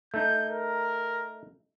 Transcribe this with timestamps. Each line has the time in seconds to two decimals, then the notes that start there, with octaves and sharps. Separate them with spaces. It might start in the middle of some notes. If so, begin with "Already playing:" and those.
0.14 A3 D#4 G6
0.50 A#4